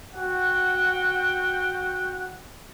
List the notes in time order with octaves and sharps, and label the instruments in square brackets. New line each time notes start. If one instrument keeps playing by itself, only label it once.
[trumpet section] F#4 F#5 G5